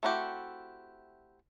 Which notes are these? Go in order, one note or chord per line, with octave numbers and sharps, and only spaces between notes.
A3 C4 E4 F#4 G4